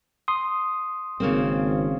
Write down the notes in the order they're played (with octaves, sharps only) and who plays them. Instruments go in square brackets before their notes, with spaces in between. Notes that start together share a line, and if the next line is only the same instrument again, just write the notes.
[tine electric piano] C6 D#6
[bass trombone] G#1 [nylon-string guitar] C#3 A#3 C4